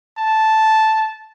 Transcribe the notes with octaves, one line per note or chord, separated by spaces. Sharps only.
A5